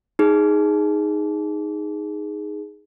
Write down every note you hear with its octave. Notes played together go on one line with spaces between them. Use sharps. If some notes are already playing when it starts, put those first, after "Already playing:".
D#4 G#4